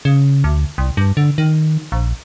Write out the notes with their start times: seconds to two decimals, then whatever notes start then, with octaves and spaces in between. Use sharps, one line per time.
0.05 C#3
0.44 D2
0.78 C2
0.97 G2
1.17 D3
1.38 D#3
1.92 A#1